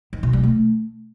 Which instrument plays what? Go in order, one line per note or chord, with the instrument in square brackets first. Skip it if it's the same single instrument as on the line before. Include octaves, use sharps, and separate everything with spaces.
[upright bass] D#3
B2
G3
A3